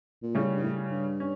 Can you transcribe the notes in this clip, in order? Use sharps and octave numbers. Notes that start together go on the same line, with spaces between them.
A#2
A2 C#3 G3 C#4
G2
A2
G2
C#4